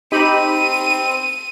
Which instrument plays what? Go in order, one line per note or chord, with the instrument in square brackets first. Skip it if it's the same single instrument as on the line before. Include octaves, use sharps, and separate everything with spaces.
[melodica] C4 [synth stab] D#4 G4 B5 [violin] D#7